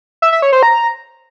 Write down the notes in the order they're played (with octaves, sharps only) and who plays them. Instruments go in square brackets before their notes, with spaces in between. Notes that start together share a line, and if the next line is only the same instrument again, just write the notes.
[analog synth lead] E5
E5
C#5
C5
A#5